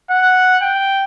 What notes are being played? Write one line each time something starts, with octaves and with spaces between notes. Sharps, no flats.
F#5
G5